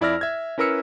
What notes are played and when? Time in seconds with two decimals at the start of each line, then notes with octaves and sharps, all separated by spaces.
0.01 F2 E4 D5 E6 F6 A#6
0.21 E5 G#6
0.58 C#4 E4 A#4 B4 E6 C#7